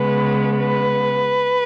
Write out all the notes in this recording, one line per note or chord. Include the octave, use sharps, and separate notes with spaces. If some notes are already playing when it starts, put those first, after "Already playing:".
Already playing: C#3 G#3 B3 B4
B4